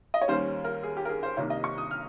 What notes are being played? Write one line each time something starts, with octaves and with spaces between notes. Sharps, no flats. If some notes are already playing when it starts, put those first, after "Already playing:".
D#5
C#5
D#2 D#3 G3 C#4 C5
A#4
G#4
G4
A#4
G#4
C5
C2 C3 D#3 A#3 C#5
D#5
C#6
D#6
F6